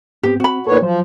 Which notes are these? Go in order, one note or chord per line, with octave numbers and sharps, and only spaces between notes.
G#2 B3 C4 G4
C4 F#4 B5
A#2 B3 D#4 A4 C#5
F3 F#3 C5